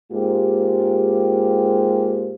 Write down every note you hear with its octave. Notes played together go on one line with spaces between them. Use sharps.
G#2 G#3 A#3 F4 G4